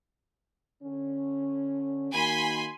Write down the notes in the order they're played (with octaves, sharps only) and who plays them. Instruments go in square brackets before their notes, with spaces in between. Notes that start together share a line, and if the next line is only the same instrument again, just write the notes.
[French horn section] D3 C#4
[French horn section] D#3 A#3 F#4 [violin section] G#5 B5 C6